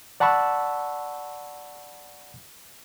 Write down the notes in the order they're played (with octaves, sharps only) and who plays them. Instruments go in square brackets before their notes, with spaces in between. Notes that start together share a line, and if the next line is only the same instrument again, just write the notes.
[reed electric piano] D5 F#5 A5 B5 C#6 E6